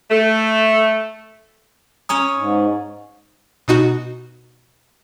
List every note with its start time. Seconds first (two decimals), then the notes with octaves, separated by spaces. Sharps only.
0.11 A3
2.09 C#4 C#5 G#5 A#5 D#6
2.37 G#2
3.68 B2 D#4 F#4